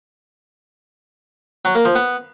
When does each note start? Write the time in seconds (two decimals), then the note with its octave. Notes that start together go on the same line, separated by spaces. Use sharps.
1.65 F#3
1.75 A#3
1.85 F3
1.95 B3